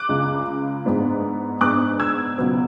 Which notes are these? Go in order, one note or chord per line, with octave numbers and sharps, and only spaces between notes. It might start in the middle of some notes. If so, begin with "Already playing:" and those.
Already playing: D6 F#6
C#2 C#3 G#3
G#2 G#3 B3 D4
G#2 G#3 B3 D4 D6 F#6
E6 G#6
C#2 B2 F#3 B3